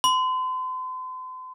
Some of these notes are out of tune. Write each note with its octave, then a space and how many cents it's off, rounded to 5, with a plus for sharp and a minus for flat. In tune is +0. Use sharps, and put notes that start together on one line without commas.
C6 -40